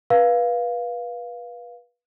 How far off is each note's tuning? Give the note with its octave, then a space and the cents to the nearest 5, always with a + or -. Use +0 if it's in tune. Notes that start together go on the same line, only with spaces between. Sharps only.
B4 -25 F5 +0